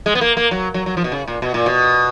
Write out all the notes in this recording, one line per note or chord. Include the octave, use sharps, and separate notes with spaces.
G#3
B3
A#3
A#3
F#3
F#3
F#3
F3
B2
C#3
A#2
B2
A#2
B2